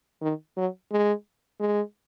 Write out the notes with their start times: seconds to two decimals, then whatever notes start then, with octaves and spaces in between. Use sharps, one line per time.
0.22 D#3
0.57 F#3
0.92 G#3
1.60 G#3